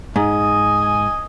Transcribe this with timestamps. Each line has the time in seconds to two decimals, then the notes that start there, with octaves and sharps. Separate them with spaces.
0.16 G#2 D#5 G#5